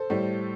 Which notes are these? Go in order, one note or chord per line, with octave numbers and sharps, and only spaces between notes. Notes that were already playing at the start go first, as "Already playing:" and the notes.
Already playing: A4 C5
A2 G3